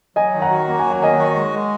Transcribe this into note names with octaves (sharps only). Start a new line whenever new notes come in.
F#3 D#5 G#5
D#3
F#5 A#5
F#4
A#3 A#5
G#5
F#3
F#5
D#3 D#5 G#5
F#4
G#3
G#3